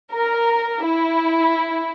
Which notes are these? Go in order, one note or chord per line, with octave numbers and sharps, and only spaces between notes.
A#4
E4